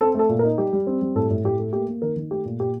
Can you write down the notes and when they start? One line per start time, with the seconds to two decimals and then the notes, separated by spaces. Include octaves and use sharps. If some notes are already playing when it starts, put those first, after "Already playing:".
0.01 C4 A4
0.15 A3 A4
0.29 A#2
0.39 A#4
0.44 D#4
0.58 G3 G4
0.73 G3
0.87 C4
1.02 G3
1.15 A2 A4
1.30 A2
1.44 A2 G4
1.59 A3
1.73 A#3 G4
1.88 A#3
2.02 D#3 A#4
2.16 D#3
2.31 A3 G4
2.45 A#2
2.60 A#2 G4